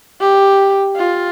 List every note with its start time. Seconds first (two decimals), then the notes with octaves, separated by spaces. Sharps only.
0.21 G4
0.96 F4